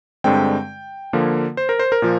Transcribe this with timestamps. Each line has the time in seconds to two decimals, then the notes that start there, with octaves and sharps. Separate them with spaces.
0.24 G2 D3 G#3 C4 G5
1.13 D3 F3 A#3
1.57 C5
1.69 A#4
1.79 C5
1.92 A#4
2.02 A#2 F3